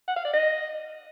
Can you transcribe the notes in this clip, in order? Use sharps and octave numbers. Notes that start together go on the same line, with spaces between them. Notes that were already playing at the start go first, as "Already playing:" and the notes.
F#5
F5
D5
D#5